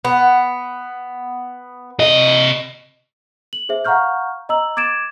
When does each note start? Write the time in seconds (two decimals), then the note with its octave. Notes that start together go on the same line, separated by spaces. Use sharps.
0.05 B3
1.99 C3 D#5
3.53 F#7
3.69 G#4 C5 E5
3.85 F5 F#5 A#5 C#6 F6 G6
4.49 D#5 A#5 E6 F#7
4.77 D6 G#6 A6 D7 E7